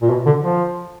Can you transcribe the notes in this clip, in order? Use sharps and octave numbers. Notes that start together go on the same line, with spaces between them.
A#2
B2
D3
F3